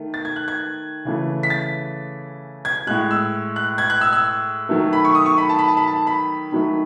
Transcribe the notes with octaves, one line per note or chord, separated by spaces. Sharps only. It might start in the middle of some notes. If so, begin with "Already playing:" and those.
Already playing: D#3 A3
A6
G#6
F#6
G#6
C#3 E3 A3
B6
A6
G#6
A2 G#3 F#6
E6
F#6
G#6
F#6
E6
E6
D#3 F#3 A3
B5
C#6
D#6
C#6
B5
A5
B5
A5
B5
A5
B5
D#3 F#3 A3